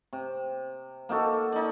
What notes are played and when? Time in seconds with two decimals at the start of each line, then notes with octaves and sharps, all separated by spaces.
0.13 C3
1.09 A#3 D#4 F#4 A4
1.52 D#4 D5